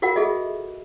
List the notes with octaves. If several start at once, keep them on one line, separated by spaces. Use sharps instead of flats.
F4 F#4 A#4 F5 F#5
F4 G#4 A4 D#5 E5